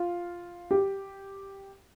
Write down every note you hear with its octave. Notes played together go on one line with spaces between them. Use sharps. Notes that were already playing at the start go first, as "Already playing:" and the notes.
Already playing: F4
G4